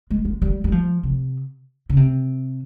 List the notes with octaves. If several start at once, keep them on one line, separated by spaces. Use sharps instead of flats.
G#3
G#3
G3
G3
F3
C3
C#3
C3